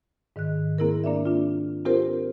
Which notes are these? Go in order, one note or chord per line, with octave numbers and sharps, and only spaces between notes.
G#2 D#3 D#5 F#6
A#3 C4 E4 G#4 A#4
A#3 D4 D5 E5
D4 F4
C4 F4 G4 A4 A#4 C5